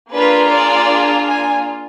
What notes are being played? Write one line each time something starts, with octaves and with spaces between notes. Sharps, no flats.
A#3 D4 F4 G#4 B4
D5
G#5